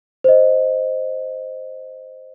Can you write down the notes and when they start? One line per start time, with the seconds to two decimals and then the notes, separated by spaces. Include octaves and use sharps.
0.24 C5 D#5